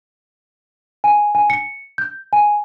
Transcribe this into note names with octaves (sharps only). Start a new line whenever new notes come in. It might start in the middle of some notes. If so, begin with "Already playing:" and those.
G#5
G#5
C#7
G6
G#5